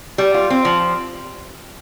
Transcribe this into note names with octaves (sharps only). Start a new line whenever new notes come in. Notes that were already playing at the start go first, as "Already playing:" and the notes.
G3
F4
C4
F3